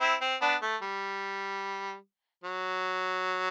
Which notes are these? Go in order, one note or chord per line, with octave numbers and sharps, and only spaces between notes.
C4 E4
C4
B3 D4
A3
G3
F#3